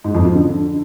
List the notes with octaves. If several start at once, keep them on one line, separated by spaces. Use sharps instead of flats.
G#2
F2
F3
D3